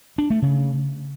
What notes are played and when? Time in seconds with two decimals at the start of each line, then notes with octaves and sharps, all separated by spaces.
0.18 D4
0.30 A3
0.42 C#3